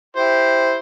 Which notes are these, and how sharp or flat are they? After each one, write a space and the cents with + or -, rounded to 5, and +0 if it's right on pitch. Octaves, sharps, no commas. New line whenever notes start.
E4 +0 G4 +0 C5 +0